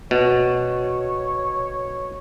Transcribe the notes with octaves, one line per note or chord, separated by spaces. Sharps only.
B2 C#5